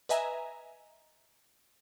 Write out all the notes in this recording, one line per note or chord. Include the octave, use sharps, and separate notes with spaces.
B4 D#5 E5 G#5 A#5